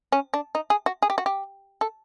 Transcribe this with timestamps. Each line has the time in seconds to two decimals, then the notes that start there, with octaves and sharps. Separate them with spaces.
0.12 C#4
0.34 D4
0.55 D#4
0.70 G#4
0.86 F#4
1.02 G#4
1.10 G4
1.18 F#4
1.26 G4
1.81 A4